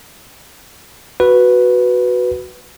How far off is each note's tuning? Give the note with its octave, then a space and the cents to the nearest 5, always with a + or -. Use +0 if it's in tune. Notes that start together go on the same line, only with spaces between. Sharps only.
F#4 +0 B4 +0